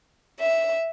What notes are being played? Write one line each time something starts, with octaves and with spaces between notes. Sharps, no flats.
E5